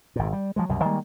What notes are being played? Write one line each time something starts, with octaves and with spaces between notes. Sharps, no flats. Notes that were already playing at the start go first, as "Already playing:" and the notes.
G#1 A#2
G3
F3 F#3 G#3
C2 F#2 B2 G3
D#3 G3 G#3 A#3